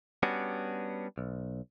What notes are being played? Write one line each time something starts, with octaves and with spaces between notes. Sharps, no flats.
G3 B3 C#4 D4 F#4
B1